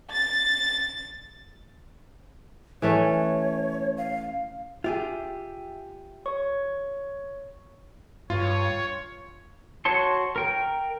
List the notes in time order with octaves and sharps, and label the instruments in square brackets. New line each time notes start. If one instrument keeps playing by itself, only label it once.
[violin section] A6
[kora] E3 A3 C#4 [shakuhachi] C#5
[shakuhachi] F5
[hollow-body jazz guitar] F4 G4 G#4 [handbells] E5
[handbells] C#5 C#6
[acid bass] G2 [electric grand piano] F4 [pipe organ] C#5
[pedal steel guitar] F#4 C#5 A5 C6
A#4 G5